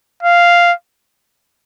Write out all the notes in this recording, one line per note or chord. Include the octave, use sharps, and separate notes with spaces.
F5